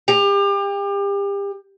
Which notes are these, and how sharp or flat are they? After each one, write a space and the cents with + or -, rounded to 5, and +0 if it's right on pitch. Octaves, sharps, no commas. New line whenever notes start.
G4 +35